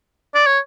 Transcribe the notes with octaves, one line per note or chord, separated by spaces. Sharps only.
D5
C#5